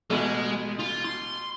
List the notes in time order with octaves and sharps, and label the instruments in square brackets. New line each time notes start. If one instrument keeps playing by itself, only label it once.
[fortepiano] A1 B2 [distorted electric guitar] G#3
[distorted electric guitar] F4
C6